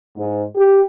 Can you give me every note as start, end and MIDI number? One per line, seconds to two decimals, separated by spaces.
0.16 0.42 44
0.56 0.84 67